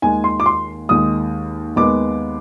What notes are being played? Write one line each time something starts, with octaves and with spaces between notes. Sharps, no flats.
D#2 D#3 G#3 G#5
C6
D6
C6
D#2 D#3 G#3 D#6
D#2 D#3 G#3 B3 D6